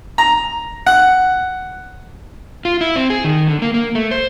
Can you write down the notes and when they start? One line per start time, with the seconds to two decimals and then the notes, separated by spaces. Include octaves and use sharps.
0.18 A#5
0.86 F#5
2.65 F4
2.81 E4
2.96 C4
3.10 G#4
3.24 D#3
3.47 D3
3.62 A#3
3.74 A#3
3.95 A3
4.11 C5